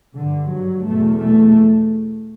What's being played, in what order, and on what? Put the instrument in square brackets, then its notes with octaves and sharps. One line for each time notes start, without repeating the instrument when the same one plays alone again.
[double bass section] G2 D3
F#3
E2 B2 A3
A3